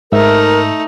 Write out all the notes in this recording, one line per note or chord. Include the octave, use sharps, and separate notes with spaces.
G#2 A3 D#4 A#4 E5